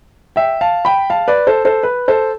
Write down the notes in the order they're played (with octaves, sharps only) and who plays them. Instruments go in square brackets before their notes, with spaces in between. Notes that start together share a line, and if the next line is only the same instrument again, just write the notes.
[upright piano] E5 G5
F5 A5
G5 B5
F5 A5
B4 D5
A4 C5
A4 C5
B4
A4 C5